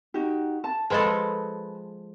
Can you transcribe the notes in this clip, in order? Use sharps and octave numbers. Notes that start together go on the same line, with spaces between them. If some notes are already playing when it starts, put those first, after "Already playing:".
D#4 F#4 G4
A5
F3 G#3 G#4 A4 B4 B5